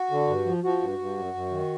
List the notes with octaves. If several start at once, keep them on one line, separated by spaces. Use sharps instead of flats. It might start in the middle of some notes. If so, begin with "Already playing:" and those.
Already playing: F#4
D3
G2
F3
F3 F#4
G2
G2
F#2
F#2
D#3